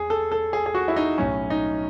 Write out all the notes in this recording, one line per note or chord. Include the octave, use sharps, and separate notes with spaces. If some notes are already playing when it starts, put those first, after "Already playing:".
Already playing: E2 G#4
A4
A4
G#4
G#4
F#4
E4
D#4
B1 A2 F#3 C#4
D#4